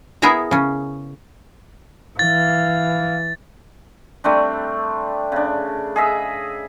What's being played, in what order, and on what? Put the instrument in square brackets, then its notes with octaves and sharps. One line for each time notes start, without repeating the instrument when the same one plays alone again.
[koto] B3 E4 G#4 A#4 E5 A#5
C#3 C#4
[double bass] E3 [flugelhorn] F5 [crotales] A6
[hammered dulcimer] G3 A3 C4 D4
C#3 D4
G#4 D#5 E5